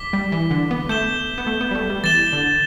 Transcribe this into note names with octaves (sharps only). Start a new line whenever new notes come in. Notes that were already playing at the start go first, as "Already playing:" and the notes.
Already playing: D6 B6 G7
G3
E3
D3
B3
A3 G6 E7 G7
B3
A3
B3
G3
A3
G3
E3 A6 E7 G7
D3